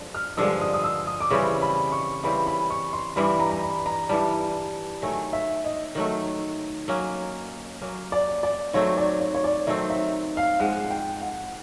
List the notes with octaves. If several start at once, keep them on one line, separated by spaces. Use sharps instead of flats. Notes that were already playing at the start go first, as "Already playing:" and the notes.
Already playing: G2 D3 F3 G#3
F6
G2 D3 F3 G#3 E6
D#6
D#6
E6
D#6
D6
C#3 E3 G3 C4 C#6
B5
C#6
C#3 E3 G3 C4 B5
B5
C#6
C6
G2 E3 G3 B5
A#5
A#5
B5
A#5
G2 E3 G3 A5
D#3 F#3 A3 G#5
E5
D#5
D#3 F#3 A3
F#3 A#3 C#4
F#3 A#3 C#4
D5
D5
D#3 F#3 A3 C4 C#5
D5
C#5
C#5
D5
D#3 F#3 A3 C4 E5
E5
F5
G#2 F3 G#3 F#5
G5
F#5